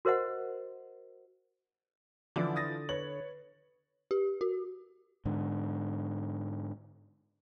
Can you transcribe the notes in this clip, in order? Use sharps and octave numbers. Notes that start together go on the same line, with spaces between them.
F#4 A#4 C5 D#5 F#5
D3 E3 F3 E4 D5
D#6 A6 A#6
B4 C#5 F#7
G4
F#4
G#2 D3